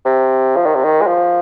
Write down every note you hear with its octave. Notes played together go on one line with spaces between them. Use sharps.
C3
F3
D#3
C3
D#3
G#3
F3